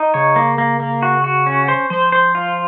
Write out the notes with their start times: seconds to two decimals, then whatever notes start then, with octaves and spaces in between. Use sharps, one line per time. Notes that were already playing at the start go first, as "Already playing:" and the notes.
Already playing: D#4
0.14 C#3 C#5
0.36 A#3
0.58 A#3
0.80 A#3
1.03 F#4
1.24 F#4
1.47 C#4
1.68 C5
1.90 F3 C5
2.12 C5
2.35 F4